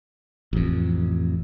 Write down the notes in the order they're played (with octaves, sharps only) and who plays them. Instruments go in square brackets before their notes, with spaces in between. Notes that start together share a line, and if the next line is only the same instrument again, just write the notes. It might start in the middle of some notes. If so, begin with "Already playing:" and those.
[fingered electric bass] A1 F2